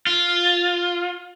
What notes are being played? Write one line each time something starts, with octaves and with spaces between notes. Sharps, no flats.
F4